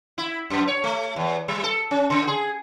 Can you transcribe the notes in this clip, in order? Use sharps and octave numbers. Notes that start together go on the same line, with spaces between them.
E4
F#2
C#5
A3
E2
G3
A4
C#4
C#3
G#4